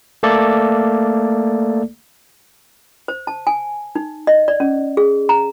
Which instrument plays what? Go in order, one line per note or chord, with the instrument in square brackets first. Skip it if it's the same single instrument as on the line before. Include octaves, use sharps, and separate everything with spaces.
[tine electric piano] A3 A#3 A4 D5
[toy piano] C5
A5
G#5
D#4
D#5
D5
C#4
G#4
A#5